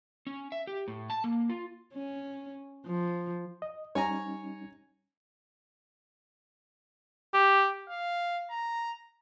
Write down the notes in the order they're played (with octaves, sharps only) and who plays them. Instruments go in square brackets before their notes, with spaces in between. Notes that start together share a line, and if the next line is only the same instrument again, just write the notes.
[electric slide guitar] C#4
E5
G4
A2
A5
A#3
F4
[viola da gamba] C#4
F3
[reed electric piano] D#5
[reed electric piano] G3 C#4 D#4 [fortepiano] C#5 G#5 A#5
[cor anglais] G4
[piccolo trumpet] F5
A#5